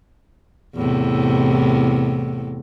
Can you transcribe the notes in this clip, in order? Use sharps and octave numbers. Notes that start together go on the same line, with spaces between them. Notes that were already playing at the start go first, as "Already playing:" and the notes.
E2 A2 C3